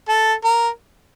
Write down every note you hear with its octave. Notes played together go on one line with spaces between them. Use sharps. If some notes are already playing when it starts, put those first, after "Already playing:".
A4
A#4